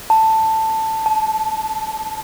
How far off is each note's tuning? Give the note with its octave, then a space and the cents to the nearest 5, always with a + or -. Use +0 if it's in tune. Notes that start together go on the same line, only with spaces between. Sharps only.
A5 +10
A5 -25